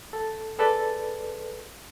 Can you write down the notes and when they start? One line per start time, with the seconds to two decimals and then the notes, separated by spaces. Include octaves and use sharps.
0.13 A4
0.59 G#4 A4 B4 D5